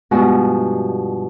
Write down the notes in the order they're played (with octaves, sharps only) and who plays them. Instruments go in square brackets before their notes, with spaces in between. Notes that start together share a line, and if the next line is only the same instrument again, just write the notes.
[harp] G2 B2 F3 G#3 F#4